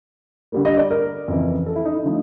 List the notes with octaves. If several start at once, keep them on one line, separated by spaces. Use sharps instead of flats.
D3 G3 A#3
D#5
D5
A#4
F2 C#3 E3
A4
E4
D#4
E4
D3 F3 A3 D#4